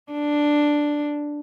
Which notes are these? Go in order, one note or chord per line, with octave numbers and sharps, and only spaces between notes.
D4